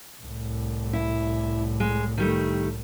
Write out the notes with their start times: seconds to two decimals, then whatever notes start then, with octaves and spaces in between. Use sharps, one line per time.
0.22 C2 A2
0.93 E4
1.80 G#3
2.18 D#3 G3 A3